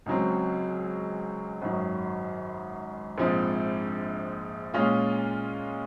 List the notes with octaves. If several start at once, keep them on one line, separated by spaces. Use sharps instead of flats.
C#2 C#3 F#3 C4
G#1 F#2 D#3 F#3
A#1 G#2 F3 G#3 C4
A#2 G#3 C#4 F4